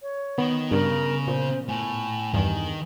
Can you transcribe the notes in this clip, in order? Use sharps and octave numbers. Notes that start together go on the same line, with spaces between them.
C#5
D#3 B3
G2 C#3 A#4
A#2 C5
A2 G#5
E2 G2 D#3